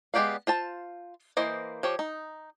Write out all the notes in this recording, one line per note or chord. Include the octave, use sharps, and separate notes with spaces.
G#3 B3 G4 D5 F5
F4 C5 A5
E3 A#3 C5 D#5
F3 G4 C#5
D#4